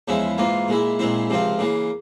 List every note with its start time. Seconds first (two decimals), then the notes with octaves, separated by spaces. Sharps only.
0.08 E2 C#3 F3 G#3 E4
0.38 G#2 E3 A#3 F4
0.68 A#2 G#3 E4
0.99 A#2 G#3 C4 E4
1.30 C#2 C3 F3 C4 F4
1.59 C#3 E3 A#3